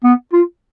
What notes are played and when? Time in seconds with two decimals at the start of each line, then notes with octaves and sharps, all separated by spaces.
0.04 B3
0.33 F4